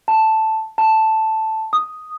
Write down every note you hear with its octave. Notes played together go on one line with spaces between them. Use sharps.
A5
A5
D#6